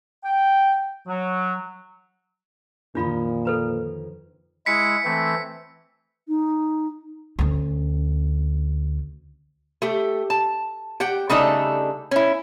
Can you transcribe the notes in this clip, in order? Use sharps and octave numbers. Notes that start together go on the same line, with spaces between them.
G5
F#3
F2 A#2 D3 D#3 D4 F4 B5
A4 B4 A#5
G#3 E4 B6 C#7
E3 A3 C4
D#4
D2 C#4
A3 G4
A5
G4 F#5 G5
C#3 G3 A3 D4 D#4 A4
C#4 E4